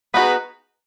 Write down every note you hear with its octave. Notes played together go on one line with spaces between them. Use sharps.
B3 D#4 F#4 G#4 B4